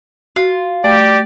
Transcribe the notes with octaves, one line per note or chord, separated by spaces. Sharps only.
F4 F#4
A3 G4 D5